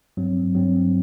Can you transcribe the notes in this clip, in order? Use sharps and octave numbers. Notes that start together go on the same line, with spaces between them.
G2 F#3 C4
G2 F#3 C4